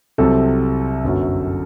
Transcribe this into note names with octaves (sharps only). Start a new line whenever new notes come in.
C2 C3 F#3 A4
G1 F#2 F#3